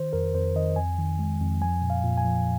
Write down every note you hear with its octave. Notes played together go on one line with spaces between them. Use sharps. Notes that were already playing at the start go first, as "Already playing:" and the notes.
Already playing: D#3 C5
F2 A#4
F2 C5
D#3 D#5
F2 G#5
D#3
G#3
F2
F3 G#5
A#2
F5
A#2
G#5
F3